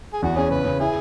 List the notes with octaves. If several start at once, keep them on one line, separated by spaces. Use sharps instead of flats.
G#4
E2 F#4
C#4 G#4
C#3 B4
C#3
E4 G#4